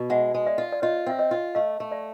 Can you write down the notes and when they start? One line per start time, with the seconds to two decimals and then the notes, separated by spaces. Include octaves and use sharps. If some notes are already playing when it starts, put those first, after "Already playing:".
Already playing: B2
0.10 G#3 E5 F#5
0.34 G#3
0.46 D5 E5
0.58 F4
0.72 D5
0.82 F4 C#5 D#5
1.06 C4 E5
1.19 C#5 D#5
1.31 F4
1.55 A3 D#5 F5
1.80 A3
1.91 D5 E5